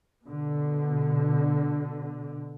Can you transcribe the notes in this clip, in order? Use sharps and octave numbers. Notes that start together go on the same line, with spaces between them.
B2 D3